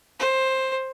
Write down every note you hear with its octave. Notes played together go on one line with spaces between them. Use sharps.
C5